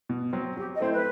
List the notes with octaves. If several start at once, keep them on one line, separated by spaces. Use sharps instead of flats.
B2
F#3 C4
F#3 G4
D#5
A3 C4 E4 C5
B4